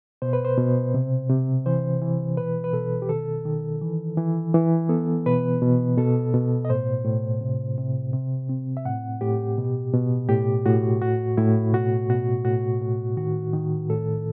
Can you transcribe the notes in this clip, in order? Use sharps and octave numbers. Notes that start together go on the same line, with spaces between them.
B2 C5
B4
C5
B2
C3
C3
E3 C5
E3
B2 B4
B4
B2 A4
G4
D#3 A4
D#3
E3
E3
E3
B3 A4
B2 B4
B2
B2 A4
B2
D#5
A2 C5
A2
C3
C3
C3
C4
E5
A2 F#5
A2 G4
B2
B2
A2 G4
A2 F#4
A2 F#4
A2 E4
B2 F#4
B2 F#4
A2 F#4
A2
D#3 F#4
D#3
A2 A4